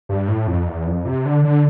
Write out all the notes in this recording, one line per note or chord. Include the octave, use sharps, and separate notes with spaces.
G2
A2
F2
E2
F2
C3
D3
D3